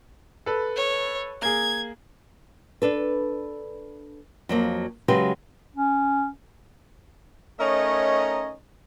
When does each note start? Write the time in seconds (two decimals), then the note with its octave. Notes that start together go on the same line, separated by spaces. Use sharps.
0.46 A4 B4
0.76 C#5
1.42 A#3 G#4 G#6
2.82 D4 A4 B4
4.49 F2 F#3 A#3
5.08 C#3 F#3 G#3 G4 B4
5.76 C#4
7.60 A3 C#4 D#4 A#4 C#5 D#5